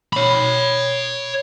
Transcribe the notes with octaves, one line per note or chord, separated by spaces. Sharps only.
C#5 B5